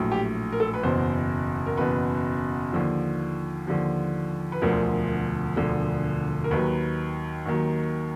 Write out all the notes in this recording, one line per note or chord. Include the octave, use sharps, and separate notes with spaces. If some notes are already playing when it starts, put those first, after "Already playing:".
Already playing: A#1 A2 F#3
G4
A#4
A4
B4
F#1 E2 B2 C5
A#4
F#1 E2 B2 B4
D#2 D3 F3
D#2 D3 F3
B4
E1 D2 D3 F3 A#4
E1 D2 D3 F3
A#4
D#2 D#3 F#3 B4
D#2 D#3 F#3